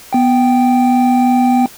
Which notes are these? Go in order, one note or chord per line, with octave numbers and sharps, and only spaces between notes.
B3 G5